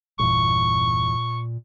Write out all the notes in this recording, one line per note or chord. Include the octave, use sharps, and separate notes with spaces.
G1 E2 A#2 C#6